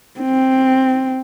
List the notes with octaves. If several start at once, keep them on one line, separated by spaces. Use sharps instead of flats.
C4